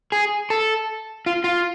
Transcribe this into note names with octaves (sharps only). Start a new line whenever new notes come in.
G#4
A4
F4
F4